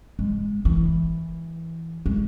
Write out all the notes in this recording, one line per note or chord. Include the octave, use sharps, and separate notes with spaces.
G#3
E3
G#3